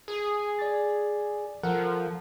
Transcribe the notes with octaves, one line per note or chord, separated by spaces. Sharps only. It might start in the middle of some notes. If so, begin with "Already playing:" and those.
G#4
D5 D6 A6
F3 A4 A#4 F#5